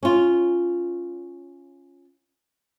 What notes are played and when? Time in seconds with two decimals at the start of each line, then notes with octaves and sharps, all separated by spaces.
0.03 C#4 F4